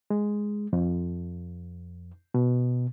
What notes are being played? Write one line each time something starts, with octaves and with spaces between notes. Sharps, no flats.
G#3
F2
B2